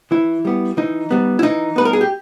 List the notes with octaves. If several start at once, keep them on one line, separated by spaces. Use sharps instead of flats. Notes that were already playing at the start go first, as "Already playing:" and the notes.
E3 E4
G3 B3
E3 D#4
G3 B3
E4
E3 D#4
G3 B3 B4
A#4
G#4
G4